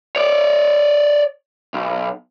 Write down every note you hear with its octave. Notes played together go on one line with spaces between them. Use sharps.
C#5 D5
B1